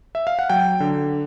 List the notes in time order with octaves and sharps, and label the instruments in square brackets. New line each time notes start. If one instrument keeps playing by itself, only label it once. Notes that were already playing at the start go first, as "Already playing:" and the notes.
[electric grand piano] E5
F5
F#5
F#3 G5
D3